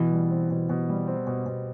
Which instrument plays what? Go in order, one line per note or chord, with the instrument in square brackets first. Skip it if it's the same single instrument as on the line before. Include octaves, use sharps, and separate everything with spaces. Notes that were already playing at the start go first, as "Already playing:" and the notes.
Already playing: [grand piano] B2 [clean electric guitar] E3
[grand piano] G3
C4
B2
B2
G3
C4
B2
B2